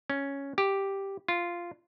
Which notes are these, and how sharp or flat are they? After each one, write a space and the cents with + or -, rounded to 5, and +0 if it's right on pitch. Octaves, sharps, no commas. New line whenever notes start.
C#4 +0
G4 +0
F4 -10